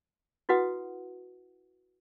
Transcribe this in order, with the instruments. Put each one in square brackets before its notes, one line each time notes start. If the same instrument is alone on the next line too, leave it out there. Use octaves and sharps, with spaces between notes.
[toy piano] E4 F#4 B4 F#5 D#6